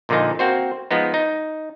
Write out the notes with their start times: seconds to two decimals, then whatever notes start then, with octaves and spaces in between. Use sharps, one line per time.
0.09 A#1 A#2 D3 F3 D#4
0.39 A#3 C4 F#4 C5
0.91 F3 G#3 B3 D#4
1.14 D#4